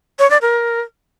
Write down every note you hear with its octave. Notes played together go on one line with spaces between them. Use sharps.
C#5
D5
A#4